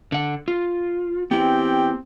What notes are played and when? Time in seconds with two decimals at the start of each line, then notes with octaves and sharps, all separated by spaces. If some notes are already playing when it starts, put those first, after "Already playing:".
0.12 D3 F#5
0.48 F4
1.31 B3 C4 E4 G4